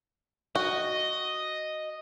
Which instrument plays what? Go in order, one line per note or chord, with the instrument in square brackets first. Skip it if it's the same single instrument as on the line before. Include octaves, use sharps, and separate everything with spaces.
[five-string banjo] F#4 [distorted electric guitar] D#5